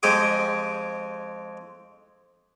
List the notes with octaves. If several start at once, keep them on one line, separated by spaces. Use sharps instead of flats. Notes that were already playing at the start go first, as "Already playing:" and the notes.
F2 G#3 G4 G#4 D6